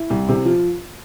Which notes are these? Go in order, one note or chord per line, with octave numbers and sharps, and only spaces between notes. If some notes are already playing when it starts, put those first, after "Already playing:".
Already playing: E4
C2
C3
F3 F4